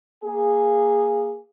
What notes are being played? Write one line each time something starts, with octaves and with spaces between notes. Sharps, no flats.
A#3 G#4